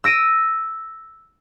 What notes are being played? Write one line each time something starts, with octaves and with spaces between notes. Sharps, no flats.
E6 A#6 D7 D#7